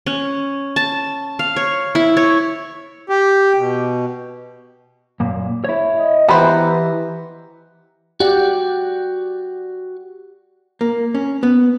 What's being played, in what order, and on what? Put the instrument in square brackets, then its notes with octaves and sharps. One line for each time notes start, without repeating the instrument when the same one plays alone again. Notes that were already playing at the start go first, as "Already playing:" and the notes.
[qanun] C#4
A5
F5
C#5
E4
C#5
[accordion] G4
B2
[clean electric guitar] F#2 A#2
E4 C#5
[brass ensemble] D#5
[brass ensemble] E3 [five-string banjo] B3 C5 [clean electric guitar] G4 D#5 A#5
[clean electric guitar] F#4 D5 F#5 [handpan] G4
[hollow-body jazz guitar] A#3
C#4
B3